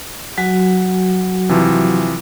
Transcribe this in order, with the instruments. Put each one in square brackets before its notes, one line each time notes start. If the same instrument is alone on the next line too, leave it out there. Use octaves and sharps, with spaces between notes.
[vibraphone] F#3 F#4 G#5
[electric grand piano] C3 E3 F3